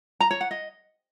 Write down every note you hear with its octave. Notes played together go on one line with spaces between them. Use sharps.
A#5
C#5
F#5
D#5